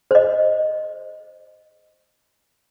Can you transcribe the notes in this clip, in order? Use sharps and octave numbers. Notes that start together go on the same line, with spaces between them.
C5 D#5